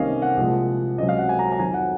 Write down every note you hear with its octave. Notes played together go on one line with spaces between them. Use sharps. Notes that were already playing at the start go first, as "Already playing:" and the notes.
Already playing: C2 C3 D#3 A#3 C#4 D#5 F5
F#5
C2 A#2 F3 G#3
C#2 C3 F#3 C#4 D#5
F5
F#5
G#5
A#5
A#5
F2 D#3 F#3 G#5
F#5